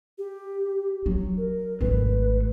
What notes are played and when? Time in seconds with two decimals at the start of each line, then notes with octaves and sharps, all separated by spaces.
0.18 G4
1.06 F#3
1.38 A#4
1.81 G#1 A3 B4